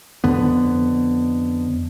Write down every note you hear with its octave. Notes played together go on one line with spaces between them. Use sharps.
F2 D3 B3